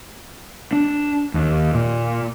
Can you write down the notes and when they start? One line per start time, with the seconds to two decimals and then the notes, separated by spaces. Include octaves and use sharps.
0.72 D4
1.34 D#2
1.74 A#2